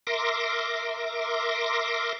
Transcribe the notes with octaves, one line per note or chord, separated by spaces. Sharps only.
A#4 E5 C6 D6 A#6